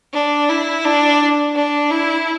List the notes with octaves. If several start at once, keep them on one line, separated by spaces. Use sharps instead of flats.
D4
E4
D4
D4
E4